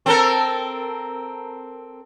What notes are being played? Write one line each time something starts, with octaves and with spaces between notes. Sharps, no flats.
C4 A4 A#4